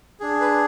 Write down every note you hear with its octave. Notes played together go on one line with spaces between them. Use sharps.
D4 G#4
B4